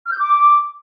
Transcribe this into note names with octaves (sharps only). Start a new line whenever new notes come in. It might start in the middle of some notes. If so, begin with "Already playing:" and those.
F6
G6
D6